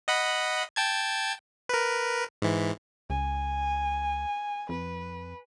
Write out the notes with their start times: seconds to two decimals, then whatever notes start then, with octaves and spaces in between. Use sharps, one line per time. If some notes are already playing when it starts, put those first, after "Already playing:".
0.08 D#5 F#5 B5
0.76 G5 A5 G#6
1.69 A#4 B4
2.42 G#2 E3
3.10 C#2 G#5
4.69 F2 B4